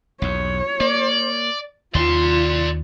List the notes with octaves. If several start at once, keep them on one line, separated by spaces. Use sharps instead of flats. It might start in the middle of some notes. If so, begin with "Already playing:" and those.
B1 E2 C#5
A#3 D5
D#2 D#3 F4 D5 C6